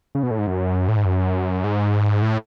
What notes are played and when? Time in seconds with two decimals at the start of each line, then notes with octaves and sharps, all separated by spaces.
0.15 C#3
0.23 B2
0.31 A2
0.39 G#2
0.47 F#2
0.88 A2
0.97 G#2
1.05 F#2
1.64 G#2
2.22 A2